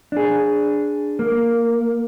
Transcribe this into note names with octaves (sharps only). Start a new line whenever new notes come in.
D4 G#4
A#3